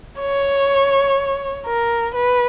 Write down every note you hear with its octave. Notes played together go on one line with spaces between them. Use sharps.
C#5
A#4
B4